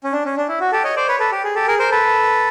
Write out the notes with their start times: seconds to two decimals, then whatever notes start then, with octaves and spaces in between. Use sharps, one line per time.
0.04 C#4
0.13 D4
0.25 C#4
0.37 D4
0.49 E4
0.60 F#4
0.72 G4 A4
0.84 C#5 D#5
0.96 C5 D5
1.08 B4 C#5
1.20 A4 B4
1.32 G4
1.44 G#4
1.55 G4 A4
1.68 G#4 A#4
1.79 A#4 C5
1.91 A4 B4